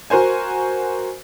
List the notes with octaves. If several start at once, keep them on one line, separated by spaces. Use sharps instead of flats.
F#4 A#4 C5 G#5